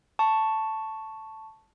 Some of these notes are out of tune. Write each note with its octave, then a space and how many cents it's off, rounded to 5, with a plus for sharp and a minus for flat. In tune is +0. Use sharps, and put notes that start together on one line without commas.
A5 +0 C#6 +0